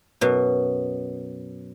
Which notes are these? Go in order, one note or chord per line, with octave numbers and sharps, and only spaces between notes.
F#2 B2